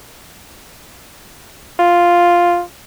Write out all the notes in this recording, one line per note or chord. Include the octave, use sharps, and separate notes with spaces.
F4